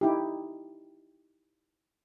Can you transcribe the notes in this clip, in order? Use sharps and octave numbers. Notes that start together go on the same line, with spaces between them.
D#4 E4 G4